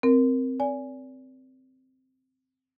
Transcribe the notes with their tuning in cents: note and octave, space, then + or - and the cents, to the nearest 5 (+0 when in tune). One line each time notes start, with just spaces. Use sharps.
C4 -5 A#4 +5
D5 -35 G#5 +0